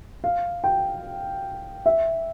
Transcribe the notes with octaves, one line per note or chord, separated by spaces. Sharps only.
F5
G5
E5